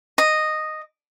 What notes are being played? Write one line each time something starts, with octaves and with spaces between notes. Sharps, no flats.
D#5